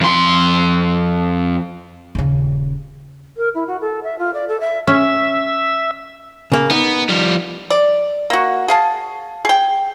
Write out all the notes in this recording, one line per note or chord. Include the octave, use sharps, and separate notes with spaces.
F2 C6
D#1 C#3
A#4
E4
F#4
A4
E5
F4
D5
A4
E5
C#4 E5
C#3 A#3
B3 D#4
F3 G3
D5
A#3 F#4
G#4 F5 A5
G#4 G5